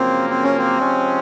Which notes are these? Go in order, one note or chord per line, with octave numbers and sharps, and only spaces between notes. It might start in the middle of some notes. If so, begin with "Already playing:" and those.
Already playing: F#2 C#3 F3 A#3 C4
C4
C#4
C4
C3 F3 G#3 C#4